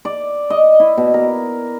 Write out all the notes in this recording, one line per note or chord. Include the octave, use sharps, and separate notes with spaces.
D5
D#5
E4
B2
A#4